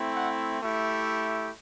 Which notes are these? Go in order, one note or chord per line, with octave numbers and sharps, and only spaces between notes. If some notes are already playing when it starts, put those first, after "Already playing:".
Already playing: A3 C4 E4
F#5
A3 E4 G4